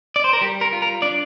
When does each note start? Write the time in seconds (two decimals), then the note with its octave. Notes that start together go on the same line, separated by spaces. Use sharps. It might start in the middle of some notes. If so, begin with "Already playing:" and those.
0.16 D5
0.24 C5
0.33 A#4
0.41 G3 G4
0.61 A#4
0.73 F4
0.82 A#4
1.02 D4 D5